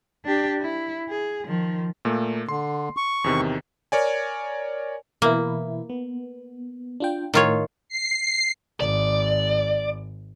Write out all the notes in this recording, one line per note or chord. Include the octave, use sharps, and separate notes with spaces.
D4 G4
E4
G#4
D#3 F3
A#2 A3 A#3
D3 C6
C#6
E2 C3 D#3
A#4 C#5 D5 G#5
B2 E3 A#3 E4
B3
D4 F4 G5
A2 D#3 F4 C#5
C7
G#1 D5